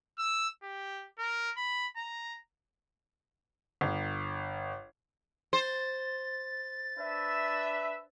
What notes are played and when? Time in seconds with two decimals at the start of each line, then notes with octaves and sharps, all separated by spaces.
0.18 E6
0.63 G4
1.19 A#4
1.57 B5
1.97 A#5
3.81 G1
5.53 C5 A6
6.98 D4 B4 E5